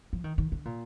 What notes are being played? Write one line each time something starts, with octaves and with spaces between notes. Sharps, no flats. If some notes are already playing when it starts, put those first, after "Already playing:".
F3
D#3
D#3
D3
A#2